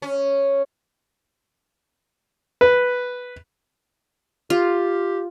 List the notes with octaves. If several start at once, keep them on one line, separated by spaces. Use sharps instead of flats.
C#4
B4
F4 G4